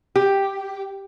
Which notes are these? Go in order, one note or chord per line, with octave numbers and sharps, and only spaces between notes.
G4